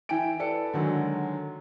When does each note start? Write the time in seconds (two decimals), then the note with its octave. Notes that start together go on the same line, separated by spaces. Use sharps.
0.09 E3 E4 G5 G#5 D7
0.40 A4 B4 D5 C#7
0.73 D3 D#3 F#3 G#3